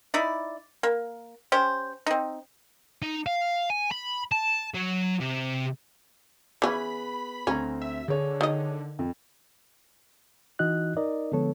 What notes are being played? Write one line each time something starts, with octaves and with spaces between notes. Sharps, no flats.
D#4 E4 D5
A#3
C#4 G4 C5
C4 D#4
D#4
F5
G#5
B5
A5
F#3
C3
E3 B3 C#4 G#4 B4 B5
D2 C4 C#4 A#5
E5
D3 G#4 C#5
D#3 D#5
F2
E3 D#4 F#4 D#5 F#6
D#4 A#4 D5 D#5
D3 F3 G#3 B3 A4 C#5